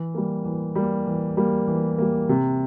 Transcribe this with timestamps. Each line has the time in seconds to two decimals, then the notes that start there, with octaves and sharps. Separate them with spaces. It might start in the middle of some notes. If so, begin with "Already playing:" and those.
Already playing: E3
0.14 G3 A#3
0.45 E3
0.75 G3 A#3
1.06 E3
1.37 G3 A#3
1.67 E3
1.98 G3 A#3
2.29 C3